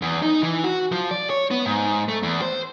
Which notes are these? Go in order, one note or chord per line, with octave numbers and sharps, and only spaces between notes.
E2
D#4
E3
F#4
F3
D5
C#5
B3
G#2
A3
E2
C5